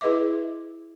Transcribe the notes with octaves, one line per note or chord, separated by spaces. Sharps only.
E4 G#4 B4 D#5 E5 D6